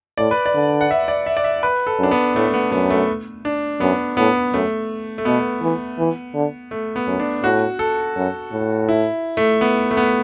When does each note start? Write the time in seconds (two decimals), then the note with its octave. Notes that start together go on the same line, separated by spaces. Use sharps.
0.18 A2 D5
0.31 B4
0.46 D5
0.54 D3
0.81 F#5
0.91 E5
1.08 D5
1.26 E5
1.37 D5
1.44 E5
1.63 B4
1.87 A4
1.99 F#2 D4
2.11 B3
2.35 A2 A3
2.54 B3
2.72 F#2 B3
2.90 A3
3.45 D4
3.80 F#2 B3
4.17 A2 B3
4.53 F#2 A3
5.18 A3
5.25 B2 B3
5.61 E3
5.98 E3
6.34 D3
6.71 A3
6.96 B3
7.07 F#2
7.20 D4
7.43 A2 F#4
7.79 A4
8.16 F#2
8.52 A2
8.89 E4
9.37 A3
9.61 B3
9.91 A3
9.97 B3